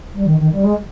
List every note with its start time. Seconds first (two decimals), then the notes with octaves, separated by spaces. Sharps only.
0.14 G3
0.26 D#3
0.39 D#3
0.52 G3
0.64 G#3